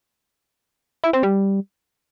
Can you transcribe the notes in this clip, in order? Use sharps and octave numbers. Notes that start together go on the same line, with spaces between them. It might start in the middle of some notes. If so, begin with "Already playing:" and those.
E4
C4
G3